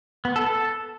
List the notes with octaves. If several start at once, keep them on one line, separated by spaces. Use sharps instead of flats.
B3
A4
A4